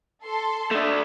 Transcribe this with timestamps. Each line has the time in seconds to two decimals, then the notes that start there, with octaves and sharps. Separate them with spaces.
0.24 A4 C6
0.71 A3 D4